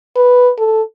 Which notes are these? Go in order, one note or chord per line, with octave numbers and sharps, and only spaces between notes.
B4
A4